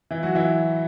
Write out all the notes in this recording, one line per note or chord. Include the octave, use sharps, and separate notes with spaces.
E3 E4
F#3 F#4
E3 E4